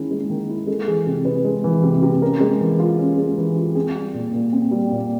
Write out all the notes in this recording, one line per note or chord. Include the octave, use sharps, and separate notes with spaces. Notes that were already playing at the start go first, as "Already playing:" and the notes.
Already playing: D#3 G#3 C#4 E4
G#3
D#3
E4
G#3 A4
E3 G#4
C3
C3 B4
G#3
E3
C3
C3
C#4 A#4
G#3
E3
F4
C#4
G#3
E3
F4
C4 G#4
G3
A#2
A#2
C4
G3
A#2